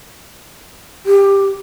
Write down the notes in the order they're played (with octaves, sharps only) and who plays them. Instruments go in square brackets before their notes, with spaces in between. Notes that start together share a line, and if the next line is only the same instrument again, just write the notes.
[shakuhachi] G4